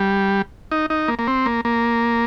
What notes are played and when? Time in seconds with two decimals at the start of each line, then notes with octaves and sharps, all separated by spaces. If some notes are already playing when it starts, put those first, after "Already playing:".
Already playing: G3
0.72 D#4
0.90 D#4
1.08 A#3
1.19 A#3
1.27 C4
1.46 A#3
1.65 A#3